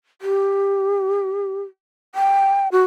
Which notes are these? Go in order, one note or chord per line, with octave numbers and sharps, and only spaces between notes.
G4
G5
F#4